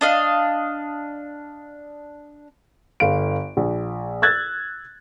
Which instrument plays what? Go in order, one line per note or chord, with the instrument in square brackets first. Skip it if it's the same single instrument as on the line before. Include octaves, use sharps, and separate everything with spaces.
[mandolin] D4 D#5 F5
[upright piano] G1 F5 D7
A#1
E6 F#6 G#6 A6